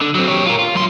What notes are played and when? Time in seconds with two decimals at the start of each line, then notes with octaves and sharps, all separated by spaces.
0.01 D3
0.15 F#3 C4
0.28 G4 C#5
0.46 F4 A#4
0.59 F4
0.75 F#3 C6